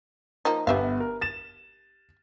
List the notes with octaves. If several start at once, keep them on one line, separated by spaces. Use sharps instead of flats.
F3 A#3 D#4
G1 B3 G4 E5 F5
A#4
A6 E7